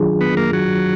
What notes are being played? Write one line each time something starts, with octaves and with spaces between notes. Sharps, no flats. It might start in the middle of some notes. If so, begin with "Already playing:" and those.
Already playing: D#3 F#3 D4 F4 G#4
B3
A#3
F#3